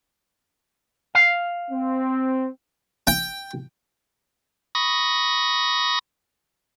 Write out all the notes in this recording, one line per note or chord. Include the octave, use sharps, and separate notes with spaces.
F5
C4
G5
B5 C#6 D#6 A#6